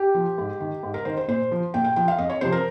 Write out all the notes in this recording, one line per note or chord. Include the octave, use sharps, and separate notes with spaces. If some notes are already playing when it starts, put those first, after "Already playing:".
Already playing: G4
F3
G#2
D#3
G#2
A#4
D#3 C5
C5
A#2 C5
F3
A#2 G5
G5
F3 G5
F5
F2 D#5
C#5
C3 F3 C5
A#4